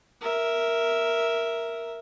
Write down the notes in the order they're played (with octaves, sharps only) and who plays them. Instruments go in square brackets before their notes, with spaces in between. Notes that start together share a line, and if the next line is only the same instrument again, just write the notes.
[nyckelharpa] A#4 E5